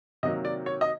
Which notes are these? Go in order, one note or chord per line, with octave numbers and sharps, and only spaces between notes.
C3 D#3 F#3 A#3 D#5
D5
C#5
D#5